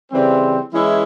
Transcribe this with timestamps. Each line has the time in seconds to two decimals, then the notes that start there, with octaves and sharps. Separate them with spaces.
0.12 C#3 E3 G3 C4
0.72 E3 G#3 C#4 E4